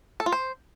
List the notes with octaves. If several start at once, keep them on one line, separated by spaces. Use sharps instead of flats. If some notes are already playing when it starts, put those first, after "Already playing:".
A4
F4
C5